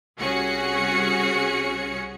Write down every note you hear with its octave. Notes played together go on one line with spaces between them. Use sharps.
C2 C#4 F#4 G#4 C#7